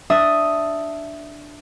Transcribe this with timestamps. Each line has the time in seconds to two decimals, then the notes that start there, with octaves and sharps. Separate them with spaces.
0.10 D4 E5 D#6